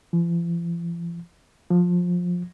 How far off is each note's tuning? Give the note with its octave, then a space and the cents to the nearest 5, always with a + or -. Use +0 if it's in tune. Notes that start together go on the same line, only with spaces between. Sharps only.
F3 -45
F3 +20